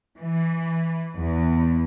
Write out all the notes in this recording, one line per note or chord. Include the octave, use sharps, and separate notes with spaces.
E3
E2